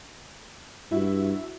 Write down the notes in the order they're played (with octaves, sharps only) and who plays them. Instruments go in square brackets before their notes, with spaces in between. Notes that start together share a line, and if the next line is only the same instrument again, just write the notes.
[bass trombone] G2 [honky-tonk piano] E4 F#4